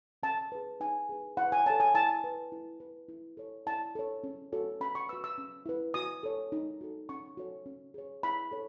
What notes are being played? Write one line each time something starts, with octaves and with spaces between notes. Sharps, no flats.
C#4 A5
G#4 B4
D#4 G#5
G#4 B4
E4 F#5
G#5
A4 C#5 A5
G#5
E4 A5
B4
E4
B4
E4
A4 C#5
E4 A5
A4 C#5
C#4
F#4 A4 C#5
C#4 B5
C#6
F#4 B4 E6
E6
C#4
E4 B4
F#4 D#6
A4 C#5
D#4
F#4 A4
C#4 C#6
F#4 A4 C#5
C#4
G#4 C#5
E4 B5
A4 C#5